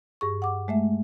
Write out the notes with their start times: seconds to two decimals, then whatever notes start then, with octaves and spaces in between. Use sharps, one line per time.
0.21 G2 G#4 C#6
0.42 F#5 D6
0.68 G#3 A3 E5